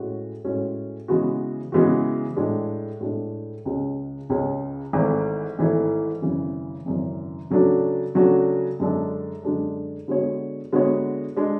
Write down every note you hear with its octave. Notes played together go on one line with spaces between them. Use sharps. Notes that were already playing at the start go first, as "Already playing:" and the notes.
Already playing: A2 G#3 C#4 F#4
A2 G#3 C#4 F#4
C#3 E3 G#3 B3 F#4
C#3 E3 G#3 B3 F#4
A2 G#3 D4
A2 G#3 D4
C#2 C#3 G#3 C#4
C#2 C#3 G#3 C#4
G#1 G#2 E3 A3 E4
G#1 G#2 E3 A3 E4
G#1 F#2 C#3 E3
G#1 F#2 C#3 E3
C#3 F#3 A3 D4 F#4
C#3 F#3 A3 D4 F#4
F#2 D3 G#3 D4 A4
F#2 D3 G#3 D4 A4
D3 G#3 B3 F#4 C#5
D3 G#3 B3 F#4 C#5
G#3 D4